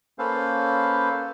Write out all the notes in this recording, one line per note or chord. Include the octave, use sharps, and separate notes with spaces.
A#3 C#4 A4 B4 C5 F5